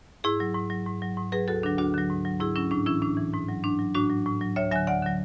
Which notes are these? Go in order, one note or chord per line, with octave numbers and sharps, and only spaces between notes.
G#2 E4 G#4
F#3
G#2
F#3
G#2
F#3
G#2
F#3 G#4 B4
D2 F#4 A4
D3 F#3 D4
D2 D4 F#4
D3 F#3
G#2
F#3
G#2 E4 G#4
F#3 C#4 E4
A2 D4
E3 C#4 E4
A2 D4
E3
G#2
F#3
G#2 D4
F#3
A2 D4 F#4
F#3
A2
F#3
D2 C#5 E5
D3 F#3 E5 G#5
D2 D5 F#5
D3 F#3